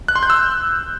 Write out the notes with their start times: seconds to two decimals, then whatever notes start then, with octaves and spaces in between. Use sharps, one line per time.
0.08 F#6
0.16 C6
0.23 G6
0.30 E6